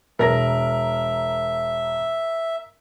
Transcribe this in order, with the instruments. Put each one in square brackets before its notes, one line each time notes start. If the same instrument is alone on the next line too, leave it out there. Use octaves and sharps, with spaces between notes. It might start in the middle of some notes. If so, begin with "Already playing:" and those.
[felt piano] E1 A#6 [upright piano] A#4 [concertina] E5